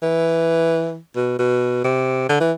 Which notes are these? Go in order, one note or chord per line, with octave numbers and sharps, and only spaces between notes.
E3
B2
B2
C3
D3
E3